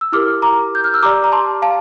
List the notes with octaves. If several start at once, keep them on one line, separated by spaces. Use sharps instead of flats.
E6
E4 G4 A#4 D6 F6
A#5 D6
G6
F6
E6
G4 D5 A#5 D6
A#5
A5 C6
F5 A5